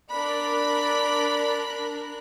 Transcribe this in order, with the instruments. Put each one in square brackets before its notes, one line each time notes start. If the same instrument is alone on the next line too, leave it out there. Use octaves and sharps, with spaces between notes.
[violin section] D4 A#4 F#6 [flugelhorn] D5 [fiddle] B5